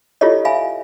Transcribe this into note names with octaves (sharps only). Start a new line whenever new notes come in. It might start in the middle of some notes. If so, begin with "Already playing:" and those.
E4 F4 G4 A4 C#5 D#5
E5 F5 G#5 B5